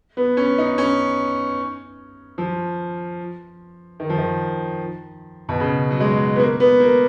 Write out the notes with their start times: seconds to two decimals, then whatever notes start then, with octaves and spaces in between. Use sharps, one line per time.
0.17 B3
0.37 C#4
0.58 D#4
0.78 C#4
2.38 F3
4.00 D#3
4.09 F3
4.18 D#3
5.49 B2
5.60 C#3
5.91 F#3
6.00 G#3
6.36 B3
6.40 A#3
6.60 B3
6.80 A#3